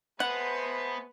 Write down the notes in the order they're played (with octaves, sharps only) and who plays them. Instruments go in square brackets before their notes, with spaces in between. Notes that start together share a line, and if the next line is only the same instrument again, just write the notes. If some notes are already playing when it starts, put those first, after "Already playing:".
[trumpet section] G#3 A3 C5 [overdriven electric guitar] B3 [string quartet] B4 [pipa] F#5